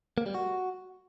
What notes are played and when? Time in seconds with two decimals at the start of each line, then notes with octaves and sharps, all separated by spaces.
0.18 A#3
0.26 G3
0.34 F#4